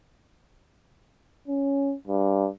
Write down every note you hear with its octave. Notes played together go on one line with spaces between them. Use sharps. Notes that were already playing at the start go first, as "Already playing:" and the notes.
C#4
G2